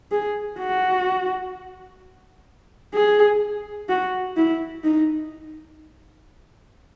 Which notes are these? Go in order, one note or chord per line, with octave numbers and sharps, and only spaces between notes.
G#4
F#4
G#4
F#4
E4
D#4